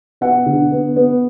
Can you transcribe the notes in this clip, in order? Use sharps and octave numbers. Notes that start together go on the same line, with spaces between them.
B3 F#5
D3
B3
B3